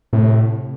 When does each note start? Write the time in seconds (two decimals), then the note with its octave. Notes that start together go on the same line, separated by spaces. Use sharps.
0.13 A2 C3